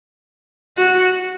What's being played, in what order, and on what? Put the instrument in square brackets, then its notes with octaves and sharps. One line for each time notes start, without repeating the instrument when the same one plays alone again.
[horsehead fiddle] F#4